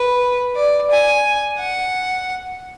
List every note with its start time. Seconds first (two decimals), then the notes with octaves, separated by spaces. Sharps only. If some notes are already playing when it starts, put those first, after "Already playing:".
Already playing: B4
0.56 D5
0.91 G#5
1.59 F#5